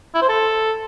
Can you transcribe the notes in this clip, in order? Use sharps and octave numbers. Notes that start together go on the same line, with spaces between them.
E4
C5
A4